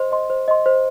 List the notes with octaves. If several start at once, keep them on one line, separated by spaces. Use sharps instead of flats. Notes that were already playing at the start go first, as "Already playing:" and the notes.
Already playing: C5 D#5 C6
D#5 C6
C5
D#5 C6
C5